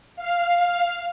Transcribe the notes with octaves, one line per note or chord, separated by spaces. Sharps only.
F5